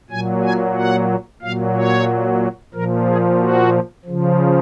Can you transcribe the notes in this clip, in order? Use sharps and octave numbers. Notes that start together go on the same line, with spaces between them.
A#2 F#3 G#5
G#5
F#5
A#2 F#3 F5
C#5
A#2 F3 A#4
G#4
F#4
C#3 F3